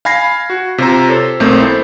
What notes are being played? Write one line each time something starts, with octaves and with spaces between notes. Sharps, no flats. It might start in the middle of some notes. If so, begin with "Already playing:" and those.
F5 G#5 B5 G#6 A#6 C7
F#4
C3 F4 C5 A#5
A4 C5 C#5
B1 A3 A#3 C4 G6
E4 A4 C5